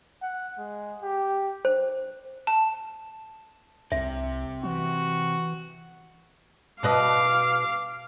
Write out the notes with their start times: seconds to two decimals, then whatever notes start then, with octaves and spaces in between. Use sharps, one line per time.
0.22 F#5
0.58 G#3
1.02 G4
1.65 C5
2.47 A5
3.92 C2 C3 E5
4.63 E3 F#4
6.83 B2 B4 D#5 F5 D6